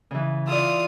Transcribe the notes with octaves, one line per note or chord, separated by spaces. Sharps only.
C#3 E3
F4 D5 D#6 E6